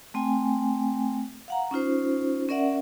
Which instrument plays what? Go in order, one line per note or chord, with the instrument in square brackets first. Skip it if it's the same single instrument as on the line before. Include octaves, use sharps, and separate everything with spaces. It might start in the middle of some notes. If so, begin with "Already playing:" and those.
[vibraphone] A3 C4 G5 G#5
F5 F#5 A#5
C#4 D#4 F4 C5
C#4 A#4 D5 E5 F#5